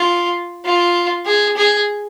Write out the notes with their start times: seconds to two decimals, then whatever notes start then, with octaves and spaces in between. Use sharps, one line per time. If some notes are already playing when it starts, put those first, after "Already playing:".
Already playing: F4
0.65 F4
1.26 G#4
1.57 G#4